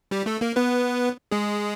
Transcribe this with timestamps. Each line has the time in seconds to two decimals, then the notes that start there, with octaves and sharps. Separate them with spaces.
0.11 G3 G4
0.26 A3 A4
0.41 A#3 A#4
0.56 B3 B4
1.31 G#3 G#4